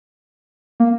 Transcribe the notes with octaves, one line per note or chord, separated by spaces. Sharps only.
A#3